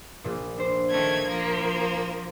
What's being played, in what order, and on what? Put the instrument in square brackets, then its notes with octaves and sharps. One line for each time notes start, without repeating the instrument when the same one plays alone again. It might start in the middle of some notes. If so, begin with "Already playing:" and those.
[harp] A#1 A#2
D4 C5
[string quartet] D#3 A3 G#6
F3 A#3